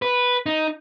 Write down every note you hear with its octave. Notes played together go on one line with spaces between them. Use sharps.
B4
D#4